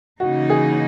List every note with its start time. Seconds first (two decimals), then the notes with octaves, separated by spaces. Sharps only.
0.20 C#3 E3 A#3 D#4 F#4
0.50 G#4